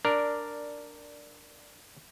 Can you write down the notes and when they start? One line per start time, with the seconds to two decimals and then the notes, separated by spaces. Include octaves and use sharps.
0.05 D4 A#4 D5